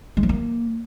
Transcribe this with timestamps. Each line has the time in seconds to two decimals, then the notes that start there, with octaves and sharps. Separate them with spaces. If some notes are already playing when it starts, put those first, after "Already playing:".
0.17 G#3
0.23 F3
0.29 A#3